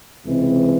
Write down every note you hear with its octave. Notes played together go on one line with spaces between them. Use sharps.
C#2 C3 E3 G#3 C4